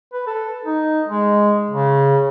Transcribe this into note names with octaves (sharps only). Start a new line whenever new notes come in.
B4
A4
D#4
G#3
C#3